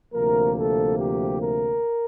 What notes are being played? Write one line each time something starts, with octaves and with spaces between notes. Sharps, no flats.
D2 C3 F3 A#3 A#4
A4
G4
A#4